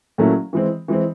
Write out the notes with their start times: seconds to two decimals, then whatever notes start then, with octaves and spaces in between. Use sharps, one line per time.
0.18 A#2 F#3 A3 C#4 E4
0.53 E3 G#3 C4
0.88 E3 G#3 C4